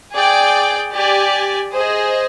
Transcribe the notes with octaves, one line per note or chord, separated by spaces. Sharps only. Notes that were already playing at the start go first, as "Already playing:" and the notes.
G#4 D5 G5
G4 D5 G#5
G#4 C5 D#5